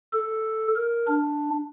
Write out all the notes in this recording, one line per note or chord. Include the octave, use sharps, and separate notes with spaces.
A4
A#4
D4